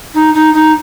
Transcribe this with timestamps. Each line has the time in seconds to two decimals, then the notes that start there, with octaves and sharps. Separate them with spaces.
0.14 D#4
0.34 D#4
0.53 D#4